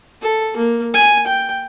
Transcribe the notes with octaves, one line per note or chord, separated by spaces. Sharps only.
A4
A#3
G#5
G5